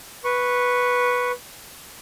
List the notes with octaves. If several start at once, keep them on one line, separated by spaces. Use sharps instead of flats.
B4 C#6